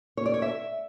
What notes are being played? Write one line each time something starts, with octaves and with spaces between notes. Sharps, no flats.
C#5
D5
C#5
E5